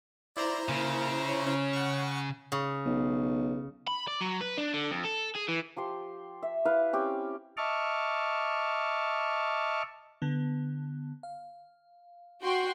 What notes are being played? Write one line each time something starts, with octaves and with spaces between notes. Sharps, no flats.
E4 C5 D5 A#5
C#3 A#3
C#5
C#4
F#5 C#6
C#3
B1
B5
D5
F#3
B4
D4
D3
F2
A4
G#4
E3
F3 G4 C6
E5
E4 B4 F5
C4 C#4 G4
D#5 E5 A5 C#6 D6 F6
D3 B3
F5
F#4 G5 C6